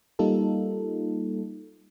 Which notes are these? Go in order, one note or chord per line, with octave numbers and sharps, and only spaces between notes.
G3 A#3 D#4 F4 A4